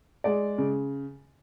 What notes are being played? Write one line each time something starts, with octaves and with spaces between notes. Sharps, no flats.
G#3 D5
C#3